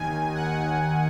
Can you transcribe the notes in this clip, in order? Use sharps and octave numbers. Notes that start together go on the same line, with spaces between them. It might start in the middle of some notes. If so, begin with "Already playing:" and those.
Already playing: D#2 D#3 G#5
F#5